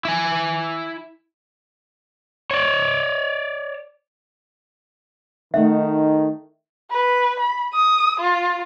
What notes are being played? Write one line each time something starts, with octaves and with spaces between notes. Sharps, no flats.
E4 G#5
C#5 D5
D#3 A3 D#4 E5 F#5
B4
B5
D#6
F4